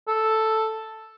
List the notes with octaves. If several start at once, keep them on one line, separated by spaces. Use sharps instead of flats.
A4